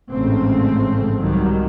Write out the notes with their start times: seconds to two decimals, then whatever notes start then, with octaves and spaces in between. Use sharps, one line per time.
0.12 A1 G#2 C#3 F3 A3 C4
1.19 C2 G#2 D#3 F#3 G3